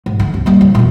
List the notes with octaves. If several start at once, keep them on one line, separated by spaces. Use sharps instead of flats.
G#2
D3
C2 D4
G3 A#3
C#3
F2 A#2